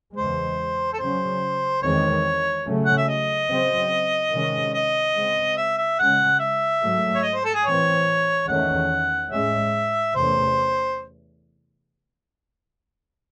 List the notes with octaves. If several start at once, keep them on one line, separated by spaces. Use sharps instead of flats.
E2 C#3 G#3 C5
A4
C#3 F#3 C#4 C5
E2 D#3 G#3 C4 C#5
C#3 F#3 A3 C#4
F#5
E5
D#5
C#3 F#3 C4
C3 D#3 G#3 C#4
D#5
C#3 G#3 C4
E5
E5
C#3 G#3 C#4 F#5
E5
G#2 F#3 A3
C#5
D#5
C5
A4
G#4
A2 E3 C4 C#5
E2 D#3 A3 C#4 F#5
A2 G#3 C#4 E5
E2 C3 E3 A3 C#4 C5